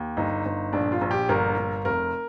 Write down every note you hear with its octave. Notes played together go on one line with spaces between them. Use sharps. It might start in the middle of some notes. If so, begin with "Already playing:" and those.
Already playing: D#2
G1 D#4
G1
A#1 D4
F4
A#1
G4
G1 A#4
G1
F1 A#4